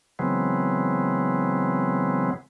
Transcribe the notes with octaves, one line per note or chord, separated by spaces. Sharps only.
C#3 E3 F#3 G#3 B3 C4